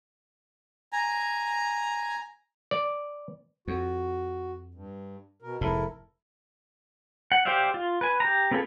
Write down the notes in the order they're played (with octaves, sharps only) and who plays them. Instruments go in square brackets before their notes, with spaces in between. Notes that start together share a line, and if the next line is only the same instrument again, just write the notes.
[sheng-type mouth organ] G#5 A#5
[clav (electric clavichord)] D5
[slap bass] F2 [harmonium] F#4
[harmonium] G2
B2 A#4
[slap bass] F1 G#2 [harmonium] E4 A4 A#4
[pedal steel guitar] F#5
G4 C5 D5 E5 F5
F4
B4 G#5
G4 A#5
B3 C4 F4 G#4 A4